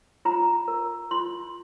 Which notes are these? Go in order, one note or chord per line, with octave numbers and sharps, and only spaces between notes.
F4 A#5
A#4
F4 C6